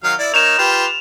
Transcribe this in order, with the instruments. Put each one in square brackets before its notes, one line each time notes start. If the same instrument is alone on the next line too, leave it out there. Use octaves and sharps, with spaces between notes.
[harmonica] D#3 F#3 F5
E4 D5
[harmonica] A#3 D#4 C#5 [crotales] E7 F7
[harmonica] F4 G4 B4